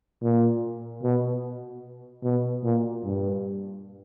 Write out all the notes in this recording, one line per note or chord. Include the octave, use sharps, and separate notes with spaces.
A#2
B2
B2
A#2
G2